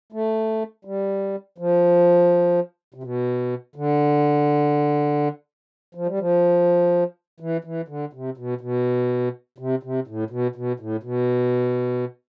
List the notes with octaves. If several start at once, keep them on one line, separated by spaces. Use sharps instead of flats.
A3
G3
F3
C3
B2
D3
F3
G3
F3
E3
E3
D3
C3
B2
B2
C3
C3
A2
B2
B2
A2
B2